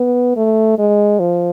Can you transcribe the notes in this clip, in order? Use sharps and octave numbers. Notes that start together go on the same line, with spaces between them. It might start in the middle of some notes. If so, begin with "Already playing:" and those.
Already playing: B3
A3
G#3
F3